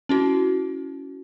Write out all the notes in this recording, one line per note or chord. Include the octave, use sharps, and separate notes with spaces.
C#4 E4 F#4